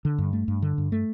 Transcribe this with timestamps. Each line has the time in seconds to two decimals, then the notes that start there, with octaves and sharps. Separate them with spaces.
0.05 D3
0.18 G2
0.33 A3
0.48 G2
0.62 D3
0.78 G2
0.92 A3